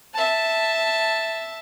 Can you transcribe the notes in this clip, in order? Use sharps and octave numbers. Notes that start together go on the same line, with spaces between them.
E5 A5